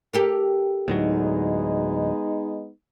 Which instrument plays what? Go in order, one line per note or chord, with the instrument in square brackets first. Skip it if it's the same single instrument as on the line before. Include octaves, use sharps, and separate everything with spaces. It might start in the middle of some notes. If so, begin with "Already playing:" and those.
[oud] G4 A4 A#4
[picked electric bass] D2 A2 F#3 [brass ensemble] G#3 B3 D#4